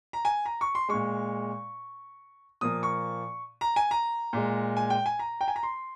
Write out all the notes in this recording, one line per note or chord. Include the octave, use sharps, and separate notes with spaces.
A#5
G#5
A#5
C#6
C6
A#2 G#3 C#6
A#2 F3 A#3 D#6
C#6
A#5
G#5
A#5
A#2 G#3
G#5
G5
G#5
A#5
G5
G#5
A#5
C6